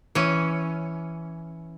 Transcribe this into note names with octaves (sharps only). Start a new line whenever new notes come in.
E3 C#4